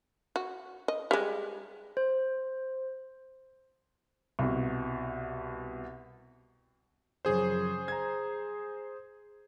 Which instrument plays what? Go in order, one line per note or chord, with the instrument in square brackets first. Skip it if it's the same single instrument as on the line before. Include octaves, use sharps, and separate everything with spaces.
[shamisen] F#4
D#5
G3 G#3
[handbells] C5
[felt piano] C2 B2
[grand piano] F#2 C#3 F3 [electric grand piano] G#4 C5
[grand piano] A#5 G#6